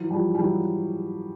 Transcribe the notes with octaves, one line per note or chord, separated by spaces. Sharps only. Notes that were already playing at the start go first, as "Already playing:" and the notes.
Already playing: E3 F#3
F3 G3
G3
E3 F#3